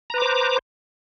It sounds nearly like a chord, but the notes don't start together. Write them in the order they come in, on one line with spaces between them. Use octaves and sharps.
A#5 B4 D6 C5